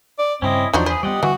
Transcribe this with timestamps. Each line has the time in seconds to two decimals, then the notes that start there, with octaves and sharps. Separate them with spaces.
0.19 D5
0.42 G2 C#3 C4 C#4 E4 D#5
0.73 E2 F3 F#3 D4 D#4 F#4 C5
0.86 G#4 B4 C5
1.03 G3 B3 G4 D5 D#5 F#5
1.23 D3 E3 G3 F#4